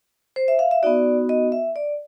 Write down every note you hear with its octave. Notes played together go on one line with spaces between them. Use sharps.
C5
E5
F5
E5
B3 D#4 F#4 D5
D#5
E5
D5